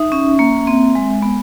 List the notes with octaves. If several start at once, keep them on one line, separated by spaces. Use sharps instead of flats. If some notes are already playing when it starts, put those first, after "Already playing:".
Already playing: D#4 E5
C#4
A#3
C4
G#3
B3